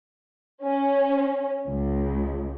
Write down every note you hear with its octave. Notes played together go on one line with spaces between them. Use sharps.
C#4
C#2